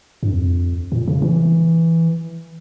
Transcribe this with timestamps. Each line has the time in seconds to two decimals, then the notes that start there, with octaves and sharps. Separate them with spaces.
0.23 G2
0.31 F2
0.92 A#2
1.08 C#3
1.22 E3